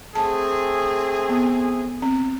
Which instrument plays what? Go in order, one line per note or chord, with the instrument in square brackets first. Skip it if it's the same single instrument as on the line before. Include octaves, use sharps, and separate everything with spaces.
[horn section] A3 C4 G#4 [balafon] A5
[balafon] B3
C4